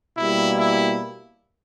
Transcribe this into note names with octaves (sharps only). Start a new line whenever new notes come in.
B2 G3 A#3 E4
E4